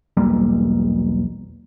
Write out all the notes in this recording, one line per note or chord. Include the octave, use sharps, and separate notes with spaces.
B1 E2 G3 A#3